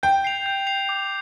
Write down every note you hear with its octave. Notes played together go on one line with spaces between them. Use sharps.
G5 G6
C7 F7
G6
C7 F7
D6